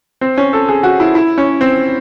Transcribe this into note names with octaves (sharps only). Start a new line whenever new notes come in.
C4
C#4
A4
G#4
F#4
E4
E4
C#4
C4